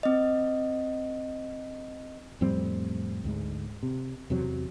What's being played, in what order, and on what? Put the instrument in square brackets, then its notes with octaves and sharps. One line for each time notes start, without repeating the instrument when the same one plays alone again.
[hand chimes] C4 D#5
[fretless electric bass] F2 A2 G3 C4
D2 G#2 G#3
C3
E2 C3 F#3